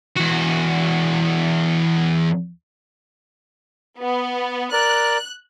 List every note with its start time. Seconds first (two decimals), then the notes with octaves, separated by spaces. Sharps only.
0.16 E2 F#4
4.00 B3
4.72 A#4 D5 F#6